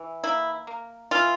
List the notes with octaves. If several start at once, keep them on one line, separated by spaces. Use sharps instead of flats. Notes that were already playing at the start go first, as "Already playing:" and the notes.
Already playing: E3
A#3 E4
A#3
E3 F4